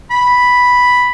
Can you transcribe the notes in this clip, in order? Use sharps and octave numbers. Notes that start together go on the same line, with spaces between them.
B5